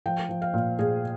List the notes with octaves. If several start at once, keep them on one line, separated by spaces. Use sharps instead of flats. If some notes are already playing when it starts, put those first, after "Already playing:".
F3 G5
F3
F5
A#2
A#2 G#4